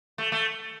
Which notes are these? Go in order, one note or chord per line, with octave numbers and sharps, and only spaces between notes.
A3
A3